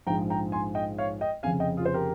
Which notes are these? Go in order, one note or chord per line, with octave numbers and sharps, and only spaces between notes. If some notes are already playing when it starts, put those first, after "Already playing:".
A#1 G#2 F3 G#3 G5 A#5
G5 A#5
G#5 C6
D#5 G5
C#5 F5
D#5 G5
F1 F2 C#3 F5 G#5
D#5 G5
F4 G#4
C5
G4 A#4